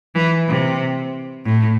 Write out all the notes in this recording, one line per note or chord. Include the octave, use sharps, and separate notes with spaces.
E3
C3
A2